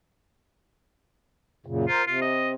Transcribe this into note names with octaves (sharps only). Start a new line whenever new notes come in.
F#2 A#2 C#3
F4 A#4 C5
C3 F4
D#5